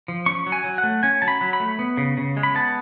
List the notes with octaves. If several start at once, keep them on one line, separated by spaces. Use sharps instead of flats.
F3
C#4 C#6
F#3
G#5
F#3
F#5
A3
C#4 G#5
F#3 A5
B5
F#3
B5
A3
B3
C#3
C#3
G#3
B5
B3 A5